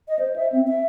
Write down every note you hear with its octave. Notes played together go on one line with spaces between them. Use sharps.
D#5
C5
E5
C4
E5